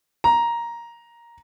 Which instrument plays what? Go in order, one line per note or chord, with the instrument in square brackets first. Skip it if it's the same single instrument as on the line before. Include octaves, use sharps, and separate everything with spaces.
[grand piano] A#5